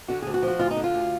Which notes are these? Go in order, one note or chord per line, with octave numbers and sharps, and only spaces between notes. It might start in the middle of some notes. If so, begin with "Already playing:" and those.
D3 F#4
D2 G#4
F#4
F3
F#4
D2 F4
D#4
D3
F4
D2